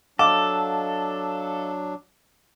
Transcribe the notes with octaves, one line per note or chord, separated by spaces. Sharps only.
F#3 D4 A4 D#5 F5 F#5 D6